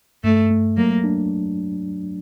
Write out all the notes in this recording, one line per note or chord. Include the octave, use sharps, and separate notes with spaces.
G2 A3
A3
F#3 A#3
D4